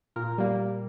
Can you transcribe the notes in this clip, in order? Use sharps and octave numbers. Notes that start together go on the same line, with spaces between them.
A#2 A#4
G3 A#3